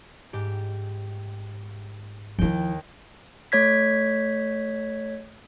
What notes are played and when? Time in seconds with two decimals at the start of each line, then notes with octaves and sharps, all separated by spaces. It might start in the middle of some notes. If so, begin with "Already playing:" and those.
0.33 G#2 G4
2.39 D#2 F3 E4 G5
3.52 A3 C#5 G#6 B6